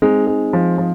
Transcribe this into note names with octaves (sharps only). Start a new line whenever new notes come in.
G#3 C4 D#4
G#3
F3
F3